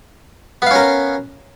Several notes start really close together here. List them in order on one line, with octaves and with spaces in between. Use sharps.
B3 F5 C#4 A#4